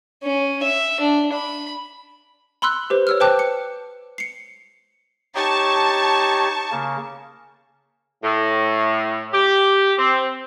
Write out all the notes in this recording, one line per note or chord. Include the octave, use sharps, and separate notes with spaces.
C#4
E5
D4
B5
B5 C6 E6 F#6
G4 B4 C5
C#5 E6 F6
B4 C5 G5 A5 D6 F#6
C#7
C7 C#7
D#4 G4 C#5 A5 C#6
C#3 A#3
A2
G4
C4